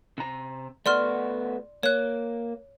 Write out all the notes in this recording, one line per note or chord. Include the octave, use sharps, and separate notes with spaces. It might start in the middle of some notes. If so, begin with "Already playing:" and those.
C3 A#5
A3 B3 F#4 D5 C6 F6
A#3 C#5 F#6